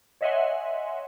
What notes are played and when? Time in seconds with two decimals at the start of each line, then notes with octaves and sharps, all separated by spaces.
0.21 C#5 D#5 E5 F#5 G#5 C6